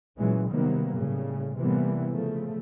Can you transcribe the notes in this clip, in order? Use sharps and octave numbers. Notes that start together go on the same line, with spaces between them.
A#2 E3 F#3 G#3 C#4
C3 D#3 F#3 G3 A#3 B3
A2 C#3 G3
A2 C3 E3 G3 A#3 B3
C#3 F3 A3